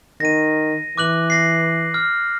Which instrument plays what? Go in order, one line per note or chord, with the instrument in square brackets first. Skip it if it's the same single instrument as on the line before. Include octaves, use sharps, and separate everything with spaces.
[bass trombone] D#3 [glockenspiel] A#6 D#7
[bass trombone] E3 [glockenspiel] D6 F#6 F#7
[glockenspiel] A#6 C7
F6